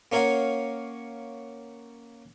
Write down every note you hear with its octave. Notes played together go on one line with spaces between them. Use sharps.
A#3 C#4 A#4 C#5 F5 F#5